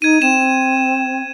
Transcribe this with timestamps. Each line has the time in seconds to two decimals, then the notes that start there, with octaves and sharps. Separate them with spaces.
0.02 D#4 G#6 D#7
0.22 C4 E7